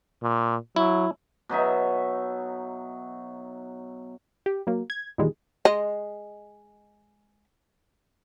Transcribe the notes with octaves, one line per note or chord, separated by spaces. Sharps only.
A#2
F#3 E4
B2 F#3 D#4 E5
G4
F#3 A#3
G#6
E2 A#2 D#3 G3 G#3
G#3 D#5